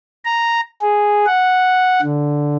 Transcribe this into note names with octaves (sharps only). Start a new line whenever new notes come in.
A#5
G#4
F#5
D3